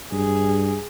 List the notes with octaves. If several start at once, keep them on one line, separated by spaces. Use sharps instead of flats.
G2 G#4